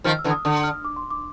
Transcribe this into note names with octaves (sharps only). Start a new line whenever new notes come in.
D#3 F3 F6
E6
D3 E3
D#6
D3 D#6
F6
D6
C6
D6